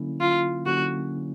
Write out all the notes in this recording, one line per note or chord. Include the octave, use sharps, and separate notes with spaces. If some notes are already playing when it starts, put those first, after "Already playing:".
Already playing: D3 F#3 A#3 C#4 E4
F4
D3 F#3 A#3 C#4 E4 F#4